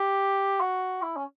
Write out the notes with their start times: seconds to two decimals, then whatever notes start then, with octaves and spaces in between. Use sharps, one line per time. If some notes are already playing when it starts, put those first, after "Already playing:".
Already playing: G4
0.61 F#4
1.02 E4
1.17 C#4